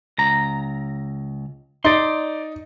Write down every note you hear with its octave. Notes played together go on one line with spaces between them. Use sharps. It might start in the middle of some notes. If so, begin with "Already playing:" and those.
C#2 A#5
D#4 D5 C6